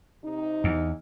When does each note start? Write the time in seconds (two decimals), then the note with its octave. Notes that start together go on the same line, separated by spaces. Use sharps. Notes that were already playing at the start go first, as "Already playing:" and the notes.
0.24 C3 D#4
0.64 E2